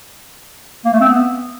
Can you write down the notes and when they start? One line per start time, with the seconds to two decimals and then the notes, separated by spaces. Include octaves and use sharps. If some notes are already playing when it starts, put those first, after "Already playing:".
0.85 A#3
0.93 A3
1.01 C4
1.09 B3